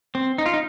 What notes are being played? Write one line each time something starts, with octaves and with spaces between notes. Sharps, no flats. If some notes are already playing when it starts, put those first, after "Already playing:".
C4
D#4
F4
D#4